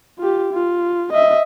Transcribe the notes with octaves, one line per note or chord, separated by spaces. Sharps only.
F4 G4
F4
D#5 E5